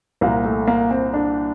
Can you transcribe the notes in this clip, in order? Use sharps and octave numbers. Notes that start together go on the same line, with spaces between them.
C2 A#2 A#3
A3
A#3
C4
D4